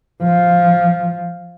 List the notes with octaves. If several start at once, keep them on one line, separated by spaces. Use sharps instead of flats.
F3